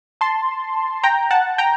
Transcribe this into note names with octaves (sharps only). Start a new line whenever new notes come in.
A5 C6
G5 A#5
F#5 A5
G5 A#5